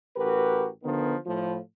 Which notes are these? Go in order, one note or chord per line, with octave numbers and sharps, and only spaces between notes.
A1 F#4 G4 A#4 B4
D3 D#3 F3 B3
A2 F3